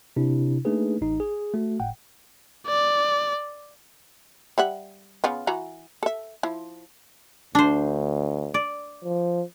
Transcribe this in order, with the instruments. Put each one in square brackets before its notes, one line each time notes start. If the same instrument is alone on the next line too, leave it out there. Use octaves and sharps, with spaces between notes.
[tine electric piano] C3 D4 E4
A3 A#3 D4 D#4 G#4 B4
A1 D#4
G#4
A3 F#4
G1 A2 F#5 G5
[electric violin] D5
[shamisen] G3 E5 F#5
C#3 B3 F4
E3 F#4 A#5
A4 E5
F3 E4
[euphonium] D2 [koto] D4 C5
[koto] D5
[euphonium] F3